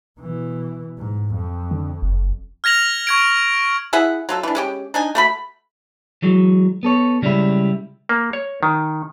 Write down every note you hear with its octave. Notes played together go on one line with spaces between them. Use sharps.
B2 E3
G#2
F2
D3
F#1
F6 G#6 A#6 F7 F#7
C#6 G#6 D7
E4 G#4 E5 F#5
F#3 F4 A4
E3 D4
G#3 C#4 G4
D4 D#4 G#5
A3 F#4 B5
E3 F#3 G#3
B3 A4 C#5
C#3 G3 G#3 C#4 E4
A#3
C#5
D#3